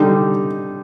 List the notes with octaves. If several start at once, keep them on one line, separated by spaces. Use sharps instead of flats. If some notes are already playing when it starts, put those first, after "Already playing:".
Already playing: D3 G3 D#4